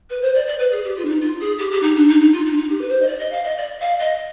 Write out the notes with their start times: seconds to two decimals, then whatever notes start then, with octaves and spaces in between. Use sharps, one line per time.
0.09 B4
0.22 C5
0.34 D5
0.47 D5
0.58 B4
0.71 G#4
0.84 G4
0.96 F4
1.04 D4
1.08 D#4
1.20 F4
1.40 G#4
1.58 G4
1.71 G4
1.82 D#4
1.96 D4
2.08 D#4
2.20 D#4
2.32 F4
2.45 D#4
2.52 D4
2.57 D#4
2.69 G4
2.81 B4
2.89 C5
3.01 D#5
3.07 D5
3.19 D#5
3.31 F5
3.43 D#5
3.57 D5
3.80 F5
3.99 D#5